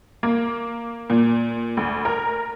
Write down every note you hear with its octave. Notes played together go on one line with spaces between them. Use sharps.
A#3
A#2
D2
A#4